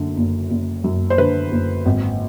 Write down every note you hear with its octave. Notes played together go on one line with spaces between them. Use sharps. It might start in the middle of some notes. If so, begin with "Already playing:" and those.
Already playing: F#1 F#2 D3
F#1
F#1
F#2
C5
D3 B4
F#1
G#1